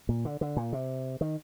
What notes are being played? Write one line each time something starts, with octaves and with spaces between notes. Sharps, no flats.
A#2
D3
D3
A#2
C3
D#3